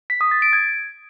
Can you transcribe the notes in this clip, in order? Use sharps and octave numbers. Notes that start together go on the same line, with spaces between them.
B6
D#6
A6
D7
G#6